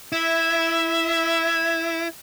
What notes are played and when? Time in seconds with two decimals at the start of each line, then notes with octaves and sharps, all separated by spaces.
0.12 E4 E5